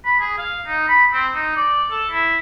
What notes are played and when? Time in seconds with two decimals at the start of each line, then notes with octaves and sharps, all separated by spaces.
0.05 B5
0.20 G#4
0.38 F5
0.67 D#4
0.88 B5
1.13 C4
1.34 D#4
1.57 D5
1.91 A4
2.11 E4